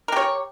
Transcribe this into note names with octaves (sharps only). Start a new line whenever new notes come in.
G4 A#4 C#5